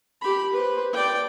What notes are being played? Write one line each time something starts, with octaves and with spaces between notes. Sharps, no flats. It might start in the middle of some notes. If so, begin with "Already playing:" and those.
G4 B5
B4 C5
D5 G5